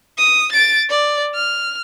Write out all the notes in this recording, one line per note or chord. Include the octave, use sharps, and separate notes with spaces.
D#6
A6 D7
D5
F6